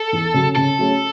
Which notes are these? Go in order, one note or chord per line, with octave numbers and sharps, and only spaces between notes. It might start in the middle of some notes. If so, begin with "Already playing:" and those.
Already playing: A4
E2
C#3 F#3 C#4
C#3 A4
F#3 A3 C#4 G#4